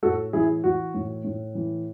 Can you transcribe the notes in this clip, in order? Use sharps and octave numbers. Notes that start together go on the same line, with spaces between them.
A2 F#4 A4
E3 E4 G#4
E3 F#4
A2
A2
E3